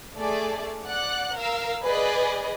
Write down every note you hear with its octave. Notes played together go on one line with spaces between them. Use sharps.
A3 G#4 D5
D5 F#5 F#6
A#4 F5 E6
G#4 B4 D5 D#5